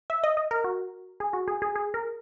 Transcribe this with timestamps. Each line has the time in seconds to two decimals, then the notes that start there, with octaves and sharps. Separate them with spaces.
0.10 E5
0.23 D#5
0.37 D#5
0.51 A#4
0.64 F#4
1.20 G#4
1.33 F#4
1.48 G#4
1.62 G#4
1.76 G#4
1.94 A#4